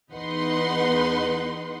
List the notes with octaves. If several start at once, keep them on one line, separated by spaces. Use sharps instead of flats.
E2 D#4 B4 F#5 C6